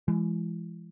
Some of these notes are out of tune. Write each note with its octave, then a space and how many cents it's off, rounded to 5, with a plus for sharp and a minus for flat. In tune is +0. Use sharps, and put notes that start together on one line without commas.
E3 +35 G#3 +0